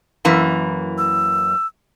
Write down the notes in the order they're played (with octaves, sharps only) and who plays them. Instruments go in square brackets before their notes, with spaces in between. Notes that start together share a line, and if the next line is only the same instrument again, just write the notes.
[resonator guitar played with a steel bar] F#2 E3 A#3
[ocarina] E6